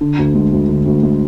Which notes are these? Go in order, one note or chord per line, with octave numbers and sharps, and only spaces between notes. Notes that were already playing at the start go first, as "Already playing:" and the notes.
D3
D2
G#3
D2
D3
D2
G#3